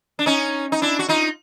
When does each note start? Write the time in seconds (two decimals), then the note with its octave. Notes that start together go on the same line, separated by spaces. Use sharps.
0.19 D4
0.26 C#4 D#4
0.72 D#4
0.82 D4 E4
0.99 F#4
1.09 D#4 F4